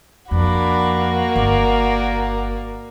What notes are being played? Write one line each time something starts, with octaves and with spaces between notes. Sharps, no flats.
F2 A#3 D4 F#4 B5
G1 A#4 D5